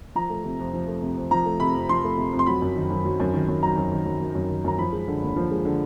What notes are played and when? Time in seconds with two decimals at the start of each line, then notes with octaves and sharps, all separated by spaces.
0.15 F3 A#5
0.30 A3
0.44 C3
0.59 F2
0.74 F3
0.88 A3
1.02 C3
1.17 F2
1.31 F3 A#5
1.46 A3
1.60 C3 B5
1.75 F2
1.89 F3 C6
2.04 A3
2.17 C3
2.33 F2
2.39 C6
2.46 F#3 B5
2.62 F#2
2.76 D#3
2.90 F#2
3.05 F#3
3.20 F#2
3.34 D#3
3.49 F#2
3.63 F#3 A#5
3.77 F#2
3.91 D#3
4.06 F#2
4.21 F#3
4.35 F#2
4.50 D#3
4.64 F#2 A#5
4.78 F3 B5
4.93 G#3
5.08 D3
5.22 D#2
5.36 F3
5.51 G#3
5.65 D3